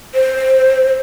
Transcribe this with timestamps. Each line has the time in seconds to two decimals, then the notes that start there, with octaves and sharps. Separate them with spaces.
0.15 C5